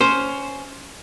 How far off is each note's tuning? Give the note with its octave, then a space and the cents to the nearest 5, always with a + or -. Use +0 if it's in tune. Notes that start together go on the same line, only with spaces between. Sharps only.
C#4 +10 C5 +0